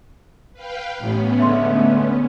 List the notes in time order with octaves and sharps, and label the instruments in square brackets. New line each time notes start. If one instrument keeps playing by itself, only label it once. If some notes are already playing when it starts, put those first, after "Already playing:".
[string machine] B4 F5 G5
[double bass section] A1 [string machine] B3 C#4
[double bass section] D3 G#3 A3 [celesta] E5 C6